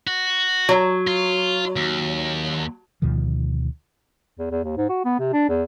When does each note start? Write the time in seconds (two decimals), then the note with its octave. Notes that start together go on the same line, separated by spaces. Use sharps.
0.07 F#4
0.69 F#3
1.07 F4
1.76 D#2
3.02 D2 B2 D#3 F3
4.39 E2
4.51 E2
4.63 D#2
4.77 G#2
4.89 F#4
5.05 B3
5.20 C3
5.33 D4
5.49 E2